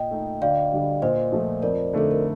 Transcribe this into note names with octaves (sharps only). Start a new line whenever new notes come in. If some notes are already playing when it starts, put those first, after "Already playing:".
Already playing: A#2 D#5 G5
A3 D#4
D2 D5 F5
D3 G3 D4
A#2 C5 D#5
F3 A3
F2 A#4 D5
D3 A3 D#4 A4
A#4